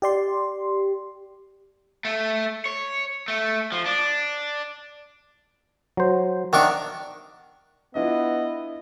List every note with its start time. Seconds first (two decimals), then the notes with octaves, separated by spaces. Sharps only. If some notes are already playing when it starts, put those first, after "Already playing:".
0.02 G4 D5 C6
2.05 A3
2.66 C#5
3.28 A3
3.72 F3
3.86 D4
5.97 F#3 C5
6.53 D#3 D4 A#4 E5 F#5 C#6
7.95 B3 D4 E4 F4 D#5